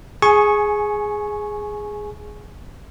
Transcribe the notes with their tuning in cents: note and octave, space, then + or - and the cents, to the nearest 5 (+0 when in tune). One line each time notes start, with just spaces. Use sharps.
G#4 +0 G#5 +20 C#6 -10